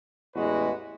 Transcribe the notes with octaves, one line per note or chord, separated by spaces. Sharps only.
A1 E2 G#3 F#4 B4